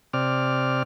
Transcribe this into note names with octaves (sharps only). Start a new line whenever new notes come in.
C3 D5 F6